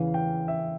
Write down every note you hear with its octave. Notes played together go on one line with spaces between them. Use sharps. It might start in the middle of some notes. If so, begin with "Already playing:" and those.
Already playing: E2 C#3 E3 F5
G5
E5